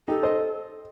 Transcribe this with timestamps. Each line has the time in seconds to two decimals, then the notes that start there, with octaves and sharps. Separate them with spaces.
0.08 D#4 G4 A4
0.23 C5 D#5